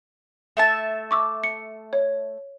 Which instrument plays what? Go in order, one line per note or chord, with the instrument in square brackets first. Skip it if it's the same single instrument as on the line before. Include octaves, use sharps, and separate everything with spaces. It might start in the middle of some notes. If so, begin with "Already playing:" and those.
[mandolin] A3 E5 A5
[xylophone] C#6 D6 E6
C#7
C#5